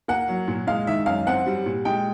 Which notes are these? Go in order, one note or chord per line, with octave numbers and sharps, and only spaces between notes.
A#3 F#5
F#3
A#2
G#3 F5
D#3 E5
F#2 F5
C4 F#5
G3
A#2
G#3 G5